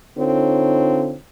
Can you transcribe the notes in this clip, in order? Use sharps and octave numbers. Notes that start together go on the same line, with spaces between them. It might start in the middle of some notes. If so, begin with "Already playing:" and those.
D3 C4 D#4 F4 A4 C#5